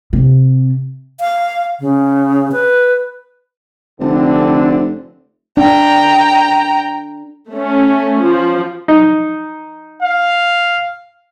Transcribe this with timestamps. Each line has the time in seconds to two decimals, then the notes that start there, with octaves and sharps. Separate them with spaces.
0.13 C3
1.20 F5
1.80 C#3
2.52 B4
4.00 F1 D3 C4 D4
5.57 D4 G5 A#5
7.50 A3 C#4
8.22 F3
8.88 D#4
10.02 F5